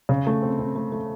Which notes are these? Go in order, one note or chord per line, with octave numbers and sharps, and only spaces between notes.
C#3
A3
C4
C4
A3
A3